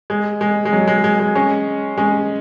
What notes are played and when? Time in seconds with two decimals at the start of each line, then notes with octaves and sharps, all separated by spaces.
0.10 G#3
0.41 G#3
0.65 G#3
0.73 F#3
0.87 G#3
1.04 G#3
1.20 G#3
1.35 G#3 C#4
1.98 G#3 C#4